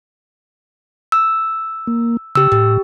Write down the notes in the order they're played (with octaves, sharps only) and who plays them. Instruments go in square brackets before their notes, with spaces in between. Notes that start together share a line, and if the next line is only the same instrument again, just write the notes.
[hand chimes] E6
[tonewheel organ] A#3
[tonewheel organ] C#3 [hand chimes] G4 E6
[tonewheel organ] A2 [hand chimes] G4